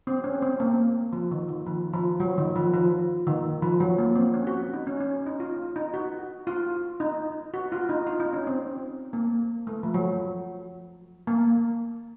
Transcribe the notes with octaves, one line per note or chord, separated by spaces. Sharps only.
C4
C#4
C4
A#3
F3
D#3
D#3
F3
F3
F#3
D#3
F3
F3
D#3
F3
F#3
A#3
C4
C#4
F#4
D#4
C#4
C#4
D#4
F4
D#4
F#4
F4
D#4
F#4
F4
D#4
F4
D#4
C#4
C4
A#3
A3
F3
F#3
A#3